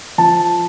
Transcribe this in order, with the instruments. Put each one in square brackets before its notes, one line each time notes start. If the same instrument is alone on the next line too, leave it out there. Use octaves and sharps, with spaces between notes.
[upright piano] F3 A5